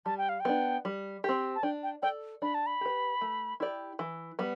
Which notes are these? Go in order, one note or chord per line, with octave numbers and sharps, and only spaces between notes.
G3 A5
G5
F5
G5
B3 D4
G3
C4 G4
A5
D4 G5
G5
A4 D5 G5
D4 B5
A5
B5
G4 B4
A3
E4 G4 D5
E3
G3 B3